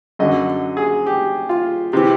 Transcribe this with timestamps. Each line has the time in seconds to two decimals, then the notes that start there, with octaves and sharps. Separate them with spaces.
0.19 F#2 D3 F#3 D#5
0.77 G#4
1.06 G4
1.49 F4
1.93 C3 E3 G4